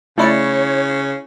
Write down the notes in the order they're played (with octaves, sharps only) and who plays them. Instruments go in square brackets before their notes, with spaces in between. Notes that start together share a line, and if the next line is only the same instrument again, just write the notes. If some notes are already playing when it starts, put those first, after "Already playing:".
[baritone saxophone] C#3 [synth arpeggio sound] A3 D5 C#7 [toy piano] E4 B5 [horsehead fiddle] C#5